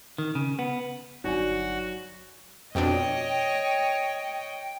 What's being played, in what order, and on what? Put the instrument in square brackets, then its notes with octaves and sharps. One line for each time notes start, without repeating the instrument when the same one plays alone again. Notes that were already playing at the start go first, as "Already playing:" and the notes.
[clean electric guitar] D#3
C#3
B3
[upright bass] G1 [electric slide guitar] F#3 [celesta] D#4 D5 G#5 [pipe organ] F#4
[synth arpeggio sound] F2 B2 D4 [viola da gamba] C#5 D#5 [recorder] G5